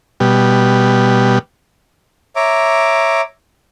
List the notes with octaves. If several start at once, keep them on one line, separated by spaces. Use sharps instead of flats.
B2 G3
C#5 E5 A#5 D6